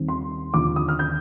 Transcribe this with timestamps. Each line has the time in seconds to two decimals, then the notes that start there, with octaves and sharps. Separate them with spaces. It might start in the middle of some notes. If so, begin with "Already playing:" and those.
Already playing: D#2 D#3 G3 C4
0.08 C6
0.54 D#2 D3 F3 D6
0.76 D#6
0.88 F6
0.99 G6